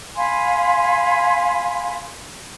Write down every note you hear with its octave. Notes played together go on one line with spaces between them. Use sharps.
F5 G#5 B5 C6